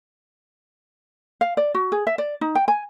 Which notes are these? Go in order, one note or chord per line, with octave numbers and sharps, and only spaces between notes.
F5
D5
F#4
G#4
E5
D5
D#4
G5
G#5